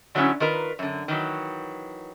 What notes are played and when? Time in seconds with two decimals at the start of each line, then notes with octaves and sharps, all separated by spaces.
0.15 D3 F#3 A3 B3 C#4 E4
0.40 D#3 F4 A#4 B4
0.79 F#2 D3
1.08 D#3 E3 F#3